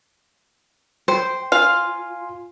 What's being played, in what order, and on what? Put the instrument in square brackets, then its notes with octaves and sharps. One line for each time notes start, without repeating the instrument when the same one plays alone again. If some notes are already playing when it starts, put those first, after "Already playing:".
[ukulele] C5 [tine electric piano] G5
[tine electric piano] F4 G#5 C6 [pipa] F5